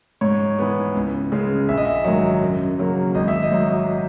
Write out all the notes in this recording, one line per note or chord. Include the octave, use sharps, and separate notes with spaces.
G#2 C#5
E3 B3
C#2
C#3 G#3
A#1 E5
D#5
E5
G#2 D#3 F#3
F#2
C#3 F#3 A#3
G#1 D#5
E5
D#5
G#2 F#3